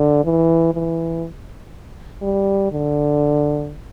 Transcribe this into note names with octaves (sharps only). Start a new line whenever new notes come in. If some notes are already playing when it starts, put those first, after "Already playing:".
Already playing: D3
E3
E3
G3
D3